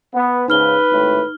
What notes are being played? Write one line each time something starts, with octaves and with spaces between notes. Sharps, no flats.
B3
G#2 C#3 D#4 B4 F6 G7
G#1 A2